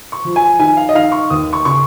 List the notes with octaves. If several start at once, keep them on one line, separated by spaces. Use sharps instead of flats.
C#6
F3
G#5
D#3 G#5
F5
D#5
D#3 F5
C#6
D#2 D#6
C#6
C#3 C#6